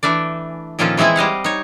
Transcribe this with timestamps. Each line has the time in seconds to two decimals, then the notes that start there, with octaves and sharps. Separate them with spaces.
0.03 E3 A3 D4 D5
0.79 A#2 D#3 F3 C#4 F4 A4
0.97 E3 G#3 C4 E4 G#4
1.16 G3 D#5 F5 F#5
1.44 D#4 C#5